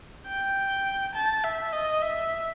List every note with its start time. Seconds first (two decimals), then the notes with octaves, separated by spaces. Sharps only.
0.28 G5
1.15 A5
1.44 E5
1.73 D#5
2.02 E5